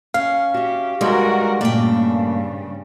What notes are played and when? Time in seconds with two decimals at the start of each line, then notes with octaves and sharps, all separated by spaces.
0.14 C#4 F5
0.54 F#4 G4 E5
1.01 G2 G3 G#3 D#4 F#4 A#4
1.61 G2 A#2 C#3 A3 A#3 D5 G5